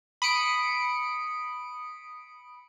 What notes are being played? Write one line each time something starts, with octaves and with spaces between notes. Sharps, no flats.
B5 D#6 C#7 D7